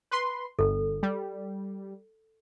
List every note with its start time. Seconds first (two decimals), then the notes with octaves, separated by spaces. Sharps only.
0.11 B4 C6
0.59 G1 A4
1.03 G3